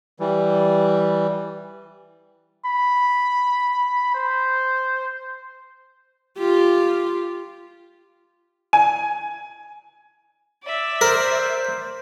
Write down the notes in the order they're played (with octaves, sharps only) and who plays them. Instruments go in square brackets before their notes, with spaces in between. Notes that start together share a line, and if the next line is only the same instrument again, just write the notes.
[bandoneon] E3 G3
[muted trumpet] B5
C5
[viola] F4 G4
[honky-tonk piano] G#5
[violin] D5 E5
[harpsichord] A#4 [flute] C5